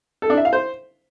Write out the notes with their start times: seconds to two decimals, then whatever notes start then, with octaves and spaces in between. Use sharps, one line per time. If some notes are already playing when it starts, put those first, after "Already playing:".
0.22 A4
0.30 D4
0.37 E5
0.45 F5
0.53 C5